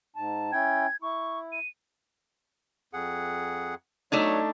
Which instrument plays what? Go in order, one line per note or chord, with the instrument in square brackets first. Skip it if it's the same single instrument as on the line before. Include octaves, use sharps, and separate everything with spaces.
[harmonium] G#2 A5
[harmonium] C#4 E4 G5 [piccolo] G#6
[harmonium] E4 [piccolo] C#6
[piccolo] D#7
[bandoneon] F2 G#4 F#5
[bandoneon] F#3 C#5 [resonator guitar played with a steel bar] A3 D4 D#4